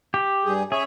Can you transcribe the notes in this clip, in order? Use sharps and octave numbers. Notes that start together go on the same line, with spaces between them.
G4
G2 G#4
C#4 G#4 C#5 E5